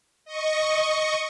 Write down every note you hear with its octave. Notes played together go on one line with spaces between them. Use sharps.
D#5 C#6